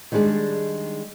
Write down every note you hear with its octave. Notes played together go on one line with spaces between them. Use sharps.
D#3 G3 G#3 D4 G#4